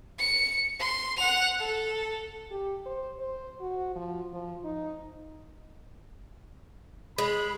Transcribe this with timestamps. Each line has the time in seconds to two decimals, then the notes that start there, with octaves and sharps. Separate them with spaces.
0.18 C#7
0.79 C6
1.16 F#5 F7
1.59 A4
2.51 G4
2.86 C5
3.19 C5
3.61 F#4
3.96 F3
4.33 F3
4.65 D#4
7.18 G#3 B5